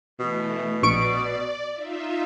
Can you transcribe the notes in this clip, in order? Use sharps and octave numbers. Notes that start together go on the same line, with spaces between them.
B2 E3 A3
A#1 D5 C#6 D7
D#4 F4 E5